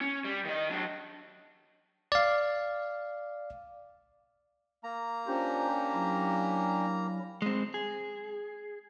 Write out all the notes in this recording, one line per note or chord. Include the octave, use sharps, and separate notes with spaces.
C#4
G3
D#3 D#5
F#3 D4
D5 F5
A#3 A#5
C#4 D4 F4 G4 C5
F#3 E4
G#3 C4
G#4